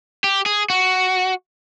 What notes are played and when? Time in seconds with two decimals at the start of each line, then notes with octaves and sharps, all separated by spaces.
0.24 G4
0.46 G#4
0.70 F#4